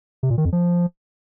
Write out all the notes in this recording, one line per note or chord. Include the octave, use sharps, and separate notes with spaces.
C3
A#2
D#3
F2
F3